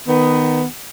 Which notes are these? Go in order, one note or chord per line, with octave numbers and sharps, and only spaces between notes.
D#3 B3